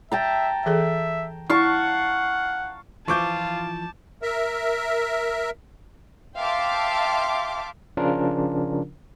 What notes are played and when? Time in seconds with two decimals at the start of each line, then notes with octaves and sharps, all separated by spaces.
0.12 E5 G5 A5 A#5
0.66 E3 G#4 A4 E5
1.50 E4 F5 F#5 A5 C#6
3.08 E3 F3 E4 F4 A5 C#6 D6 G6
4.22 A#4 E5
6.37 E5 F5 G5 A5 C6 D6
7.97 C#3 F3 C#4 D4 F4 A#4